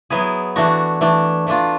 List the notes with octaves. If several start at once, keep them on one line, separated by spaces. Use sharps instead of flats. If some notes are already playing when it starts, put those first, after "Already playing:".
F#3 B3 E4 G#4
E3 A3 D4 F#4
E3 A3 D4
E3 A3 D4 F4